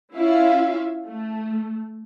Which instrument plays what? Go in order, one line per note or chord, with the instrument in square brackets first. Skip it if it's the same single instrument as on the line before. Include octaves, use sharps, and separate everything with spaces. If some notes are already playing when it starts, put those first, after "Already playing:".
[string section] C#4 E4 F4 E5 F5
A3